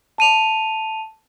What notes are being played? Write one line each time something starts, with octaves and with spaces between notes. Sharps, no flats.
A5 D#7 F7